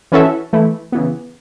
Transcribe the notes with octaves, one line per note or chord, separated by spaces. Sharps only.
E3 C#4 F#4 A4 E5
E3 A3 E4
C#3 E3 B3